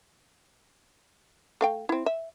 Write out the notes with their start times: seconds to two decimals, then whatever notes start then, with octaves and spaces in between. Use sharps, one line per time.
1.61 A3 F5 G5
1.89 C4 E4
2.06 E5